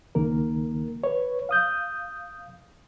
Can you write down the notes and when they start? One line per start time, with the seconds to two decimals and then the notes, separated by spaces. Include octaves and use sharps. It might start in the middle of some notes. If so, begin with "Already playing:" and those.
0.15 C#2 D#3 A#3 A#4
1.04 B4 C#5
1.49 F5 D#6 G6